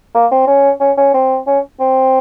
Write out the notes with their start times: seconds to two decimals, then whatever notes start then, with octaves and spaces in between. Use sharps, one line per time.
0.15 A#3
0.31 C4
0.47 C#4
0.80 C#4
0.97 C#4
1.14 C4
1.47 C#4
1.80 C4